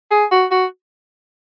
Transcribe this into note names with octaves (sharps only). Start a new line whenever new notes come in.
G#4
F#4
F#4